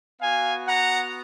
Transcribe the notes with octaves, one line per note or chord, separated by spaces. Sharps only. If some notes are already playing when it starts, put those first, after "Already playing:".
B3 F#4 F5 G#5
F#5 A#5